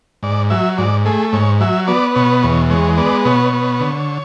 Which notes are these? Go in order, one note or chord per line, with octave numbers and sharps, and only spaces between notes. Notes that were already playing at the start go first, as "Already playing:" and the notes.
G#2 D5
F#3 E5
G#2 D5
A3 G#4
G#2 C#5
F#3 E5
B3 D5
B2 C#5
E2 C#5
G#3 C#5
B3 D5
B2 C#5
B3
D3